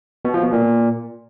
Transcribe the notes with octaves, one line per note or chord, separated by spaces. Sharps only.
B2
F3
B2
A#2